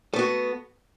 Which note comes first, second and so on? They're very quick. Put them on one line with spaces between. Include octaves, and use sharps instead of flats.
A3 B3 F#4